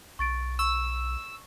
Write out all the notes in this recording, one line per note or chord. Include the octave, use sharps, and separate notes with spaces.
B1 C#6 A6 D7
C#6 E6